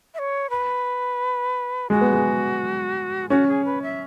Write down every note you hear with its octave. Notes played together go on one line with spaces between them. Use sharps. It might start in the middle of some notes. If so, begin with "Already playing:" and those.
E5
C#5
B4
G#3 F#4
B3
G#3
C#4 F#4
G#4
B4
E5